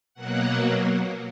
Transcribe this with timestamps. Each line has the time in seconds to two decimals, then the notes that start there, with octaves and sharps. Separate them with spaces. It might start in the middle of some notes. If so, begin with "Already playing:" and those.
0.14 B2 F#3 A#3 F#5